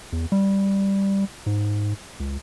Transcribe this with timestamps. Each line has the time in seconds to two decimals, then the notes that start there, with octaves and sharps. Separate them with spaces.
0.12 E2
0.32 G3
1.46 G#2
2.20 C#2